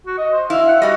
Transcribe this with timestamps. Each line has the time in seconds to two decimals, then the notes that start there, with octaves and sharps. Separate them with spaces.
0.06 F#4
0.18 D#5
0.33 C5
0.50 E4 F5
0.68 F#5
0.82 G3 F#4 D#5